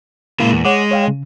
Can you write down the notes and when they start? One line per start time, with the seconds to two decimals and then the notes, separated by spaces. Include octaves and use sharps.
0.40 A#2 C#3 G#3 A#3 E4 F5
0.52 E2
0.65 G#3 C#5 F#5 D6
0.91 C#5 F5 G5
1.08 C#3